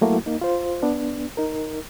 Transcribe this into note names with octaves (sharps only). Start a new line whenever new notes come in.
F#3 A3 A#3 E4 F#4
A#3 D#4
F4 C5
B3 D4
D#4 A#4